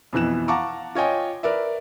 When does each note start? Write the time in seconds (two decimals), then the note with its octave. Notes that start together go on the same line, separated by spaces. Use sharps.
0.13 F2 B2 E3 F#6 E7
0.48 F5 F#5 A5 A#5 C#6 D6
0.95 F4 C#5 D#5 G5 G#5
1.43 A#4 B4 D5 E5